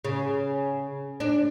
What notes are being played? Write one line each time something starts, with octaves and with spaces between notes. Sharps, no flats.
C#3
D4